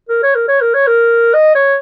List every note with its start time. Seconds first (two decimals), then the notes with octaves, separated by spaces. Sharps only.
0.09 A#4
0.23 C#5
0.35 A#4
0.48 C#5
0.61 A#4
0.74 C#5
0.87 A#4
1.34 D#5
1.55 C#5